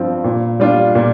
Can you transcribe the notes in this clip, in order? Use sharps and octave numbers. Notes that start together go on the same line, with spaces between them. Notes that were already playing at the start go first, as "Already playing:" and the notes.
Already playing: G2 F3 C4
A#2
G3 D4 F4
A#2